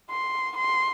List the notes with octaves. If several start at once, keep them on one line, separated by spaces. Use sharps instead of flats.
C6
C6